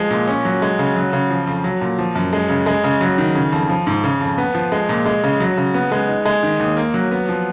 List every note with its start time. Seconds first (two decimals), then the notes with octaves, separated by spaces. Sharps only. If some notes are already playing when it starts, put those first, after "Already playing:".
Already playing: F3 G#3
0.10 A#2
0.27 C#4
0.45 F#3
0.62 G#3
0.79 C#3
0.96 F#3
1.13 C#3
1.30 F3
1.47 F2
1.64 F#3
1.81 A#2
1.98 F3
2.16 F#2
2.33 G#3
2.50 C#3
2.66 G#3
2.84 C#3
3.01 F#3
3.18 D#3
3.35 C#3
3.52 F2
3.69 F3
3.87 G#2
4.04 C#3
4.21 F2
4.38 B3
4.55 F3
4.72 G#3
4.89 A#2
5.06 G#3
5.23 C#3
5.40 F#3
5.57 C#3
5.74 B3
5.92 G#3
6.08 D#4
6.25 G#3
6.43 D#3
6.60 D#2
6.77 A#3
6.94 F#3
7.11 B3
7.28 F3